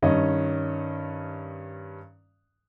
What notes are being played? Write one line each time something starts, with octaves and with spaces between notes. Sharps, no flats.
G2 D#3 C#4 D#5